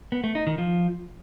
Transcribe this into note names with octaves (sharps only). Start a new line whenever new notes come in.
B3
A3
D#4
D#3
F3